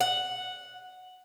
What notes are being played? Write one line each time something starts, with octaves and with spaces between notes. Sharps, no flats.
F#5